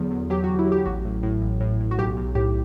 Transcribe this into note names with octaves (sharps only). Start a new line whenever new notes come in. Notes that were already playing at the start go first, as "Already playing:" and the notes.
Already playing: E2 D3 F#3
E2
F#3 G4
F#4
E2
E4
F#3 G4
A1 F#4
A2
A2
A1
A2
A2
F#4
B1 G4
B1
A2 G4